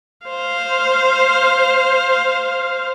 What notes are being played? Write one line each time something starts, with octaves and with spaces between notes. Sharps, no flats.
C5 F5